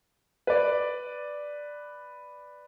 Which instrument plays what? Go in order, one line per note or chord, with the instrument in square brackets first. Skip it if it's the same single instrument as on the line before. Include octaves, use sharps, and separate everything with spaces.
[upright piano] B4 D5